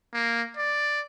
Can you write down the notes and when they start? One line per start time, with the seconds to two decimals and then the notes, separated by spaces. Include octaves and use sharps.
0.14 A#3
0.57 D5